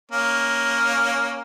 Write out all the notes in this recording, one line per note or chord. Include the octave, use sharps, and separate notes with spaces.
A#3 C#4